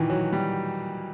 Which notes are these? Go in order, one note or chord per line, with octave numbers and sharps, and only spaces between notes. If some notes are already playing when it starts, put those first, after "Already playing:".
Already playing: A#2 D#3 E3
F#3
G3